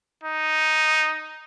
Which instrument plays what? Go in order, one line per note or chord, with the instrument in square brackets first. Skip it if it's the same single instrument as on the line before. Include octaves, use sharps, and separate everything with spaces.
[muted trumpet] D#4